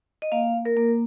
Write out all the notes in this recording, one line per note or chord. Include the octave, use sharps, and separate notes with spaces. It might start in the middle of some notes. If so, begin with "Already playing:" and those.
D#5
A#3 F5
A#3
A#4
A#3